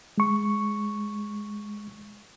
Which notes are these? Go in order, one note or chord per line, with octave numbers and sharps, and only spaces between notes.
G#3 C#6